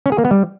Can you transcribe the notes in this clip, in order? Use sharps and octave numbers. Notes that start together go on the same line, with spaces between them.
C#4
G#4
A#3
B3
G3